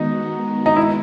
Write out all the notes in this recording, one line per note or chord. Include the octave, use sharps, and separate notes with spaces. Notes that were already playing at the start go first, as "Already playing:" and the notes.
Already playing: D#3 G#3 B3 D#4 F#4
D#4
E4